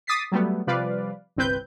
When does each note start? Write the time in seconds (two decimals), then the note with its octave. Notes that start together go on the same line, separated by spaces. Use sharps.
0.07 D6 D#6 A6 B6 C7
0.32 F#3 G3 A3 B3
0.67 C3 F3 G3 B4 D5 F5
1.36 G1 C2 C4 B4 G6